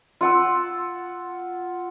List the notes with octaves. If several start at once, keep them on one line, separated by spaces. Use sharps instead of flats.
F4 F#5 E6